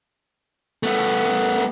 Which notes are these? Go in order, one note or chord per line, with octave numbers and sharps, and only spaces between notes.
A3 B3